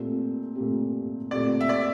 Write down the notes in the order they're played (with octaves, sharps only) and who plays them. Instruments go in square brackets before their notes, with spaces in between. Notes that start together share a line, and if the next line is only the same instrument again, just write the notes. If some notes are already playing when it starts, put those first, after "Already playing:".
Already playing: [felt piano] A#2 A3 C4 G4
A#2 A3 C4 G4
[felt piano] A#2 A3 C4 G4 [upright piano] D5
[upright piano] E5
D5